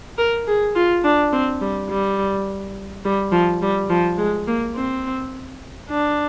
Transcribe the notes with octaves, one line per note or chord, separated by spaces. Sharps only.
A#4
G#4
F4
D4
C4
G3
G3
G3
F3
G3
F3
G#3
A#3
C4
D4